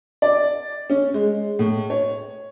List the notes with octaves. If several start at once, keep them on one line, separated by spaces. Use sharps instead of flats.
D5
C#4
G#3
A2
C#5